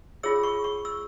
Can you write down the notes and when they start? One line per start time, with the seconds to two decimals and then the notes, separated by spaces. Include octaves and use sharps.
0.23 F4 G#4 C#5 E6
0.43 C#6
0.64 C#6
0.85 E6